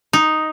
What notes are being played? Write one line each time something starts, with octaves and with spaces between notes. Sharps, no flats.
D#4